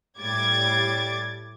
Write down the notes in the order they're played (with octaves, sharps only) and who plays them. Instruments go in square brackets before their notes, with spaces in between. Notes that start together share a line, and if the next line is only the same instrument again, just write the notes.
[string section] A2 G3 D6 G#6 A6